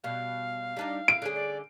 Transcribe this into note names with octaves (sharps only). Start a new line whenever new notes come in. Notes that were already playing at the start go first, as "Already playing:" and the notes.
B2 G3 F5
G3 D4 D#4
E4 D7
D3 C#4 G#4
D5